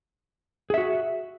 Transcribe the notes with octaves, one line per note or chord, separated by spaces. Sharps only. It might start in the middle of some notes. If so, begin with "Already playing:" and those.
F#4 G#4 E5